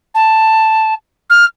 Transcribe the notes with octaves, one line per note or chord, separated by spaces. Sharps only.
A5
F6